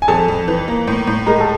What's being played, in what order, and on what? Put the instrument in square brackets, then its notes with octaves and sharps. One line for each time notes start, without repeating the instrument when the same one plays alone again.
[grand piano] G#5
[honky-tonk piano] F2 [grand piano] A4 A5
[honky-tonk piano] F2
E3
A#3
A2
A2
[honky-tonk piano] G#3 [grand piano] A#4 A#5
[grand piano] A4 A5